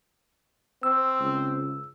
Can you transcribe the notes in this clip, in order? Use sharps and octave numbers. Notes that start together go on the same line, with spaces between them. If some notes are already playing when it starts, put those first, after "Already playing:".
C4 E6
C#2